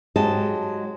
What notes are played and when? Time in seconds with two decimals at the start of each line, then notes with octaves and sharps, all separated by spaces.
0.16 G#2 F#3 G#3 G4 D#5 A5